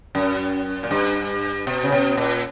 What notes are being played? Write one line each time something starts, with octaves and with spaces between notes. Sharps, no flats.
F#2
A#2
G2
B2
C#3
B2
A#2